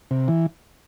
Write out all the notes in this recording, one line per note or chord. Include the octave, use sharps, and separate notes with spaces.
C3
E3